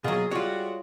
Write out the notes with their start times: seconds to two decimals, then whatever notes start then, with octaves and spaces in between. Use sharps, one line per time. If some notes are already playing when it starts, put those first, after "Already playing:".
0.04 B2 F#3 A#3 F4 G#4
0.31 G3 G#3 F4 F#4 C#5